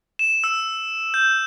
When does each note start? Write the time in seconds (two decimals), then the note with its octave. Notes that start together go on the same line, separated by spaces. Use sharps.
0.19 E7
0.44 E6
1.14 G6